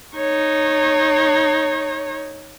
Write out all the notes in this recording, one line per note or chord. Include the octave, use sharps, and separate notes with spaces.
D#4 C#5